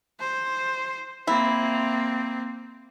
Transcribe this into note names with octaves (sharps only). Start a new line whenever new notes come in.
C5
A#3 C4 E4